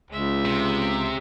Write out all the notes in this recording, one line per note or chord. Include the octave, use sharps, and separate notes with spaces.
C#2 G#3 E5
C3